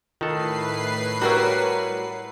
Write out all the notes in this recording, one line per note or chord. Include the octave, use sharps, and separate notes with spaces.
A2 D#3 F4 A4 B4 C7
G3 F#4 A#4 C#5 A#5 E6